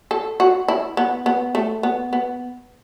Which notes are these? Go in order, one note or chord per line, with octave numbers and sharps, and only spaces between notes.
A4
F#4
E4
B3
B3
A3
B3
B3